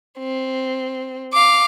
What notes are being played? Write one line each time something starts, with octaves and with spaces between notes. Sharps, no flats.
C4
F5 D6